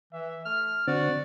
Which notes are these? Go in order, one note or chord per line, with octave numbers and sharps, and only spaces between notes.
E3 E5
A3 F6
D3 C4 F#4 D5